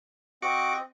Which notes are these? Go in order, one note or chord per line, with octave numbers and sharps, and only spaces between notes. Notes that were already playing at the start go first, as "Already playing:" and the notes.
C4 F#4 D#5 C#6 D6